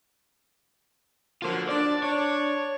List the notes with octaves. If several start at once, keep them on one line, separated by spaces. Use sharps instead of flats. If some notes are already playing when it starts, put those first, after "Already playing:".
D3 F#3 A#3 F4 C5
D4 D5
D4 C#5